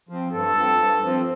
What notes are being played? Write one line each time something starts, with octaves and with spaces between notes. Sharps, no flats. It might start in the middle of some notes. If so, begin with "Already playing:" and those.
F3 C4
G2 A4
F3 C4
G2
F3 C4